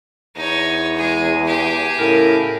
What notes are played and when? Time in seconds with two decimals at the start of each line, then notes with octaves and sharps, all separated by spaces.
0.36 E2 D#4 C#5
0.96 G#3 G#4
1.46 G4 G#4
1.99 A2 C#3 A#4